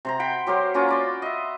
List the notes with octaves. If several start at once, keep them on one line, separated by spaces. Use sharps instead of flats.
C3 C5 A#5
F#5 G5 B5 C6
F#3 G4 A#4 C5
A#3 C#4 F4 F#4
C5 D5 B5
D#5 E5